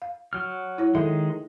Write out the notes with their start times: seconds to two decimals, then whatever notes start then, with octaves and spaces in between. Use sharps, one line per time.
0.02 F5
0.33 F#3 F6
0.78 E4 C#5
0.95 D#3 G#3 A4 E5 C6